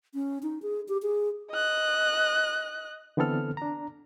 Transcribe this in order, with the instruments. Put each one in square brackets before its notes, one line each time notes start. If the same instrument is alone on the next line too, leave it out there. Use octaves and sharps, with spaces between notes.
[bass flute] C#4
D#4
G#4
G4
G#4
[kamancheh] D#5 F#6
[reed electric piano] D3 E3 B3 C4 A4 F6
D4 A#5